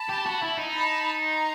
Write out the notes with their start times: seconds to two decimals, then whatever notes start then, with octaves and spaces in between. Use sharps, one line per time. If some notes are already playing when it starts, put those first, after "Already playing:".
Already playing: A5 B5
0.09 G4
0.26 F#4
0.42 E4
0.57 D#4
0.73 A5 B5
1.24 A#5 C6